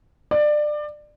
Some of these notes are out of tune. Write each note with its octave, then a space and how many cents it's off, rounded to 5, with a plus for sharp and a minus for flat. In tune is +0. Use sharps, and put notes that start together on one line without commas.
D5 +25